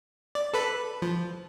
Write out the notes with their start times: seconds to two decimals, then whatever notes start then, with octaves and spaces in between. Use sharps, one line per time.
0.35 D5
0.53 A4 B4 B5
1.02 F3